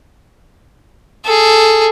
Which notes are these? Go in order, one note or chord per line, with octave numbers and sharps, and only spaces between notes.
G#4 A4